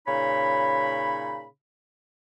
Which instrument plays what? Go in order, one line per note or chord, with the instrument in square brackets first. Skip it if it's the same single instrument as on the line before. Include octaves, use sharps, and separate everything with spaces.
[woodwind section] A#2 C#3 D#4 C#5 B5